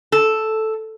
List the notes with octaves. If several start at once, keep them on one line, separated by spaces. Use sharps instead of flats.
A4